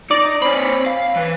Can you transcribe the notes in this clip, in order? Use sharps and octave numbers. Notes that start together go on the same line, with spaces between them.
D#4 D5
C4 C#5 B5
B6
F5
E3 B4